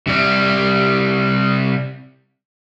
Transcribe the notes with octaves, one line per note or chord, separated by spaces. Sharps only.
C3 G3